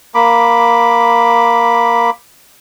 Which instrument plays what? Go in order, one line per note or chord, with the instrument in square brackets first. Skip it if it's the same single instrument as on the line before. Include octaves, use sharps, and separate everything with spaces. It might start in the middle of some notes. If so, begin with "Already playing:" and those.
[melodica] A#3 B5 D6